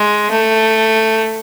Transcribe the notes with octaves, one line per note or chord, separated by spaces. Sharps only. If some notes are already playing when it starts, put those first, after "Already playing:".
Already playing: G#3
A3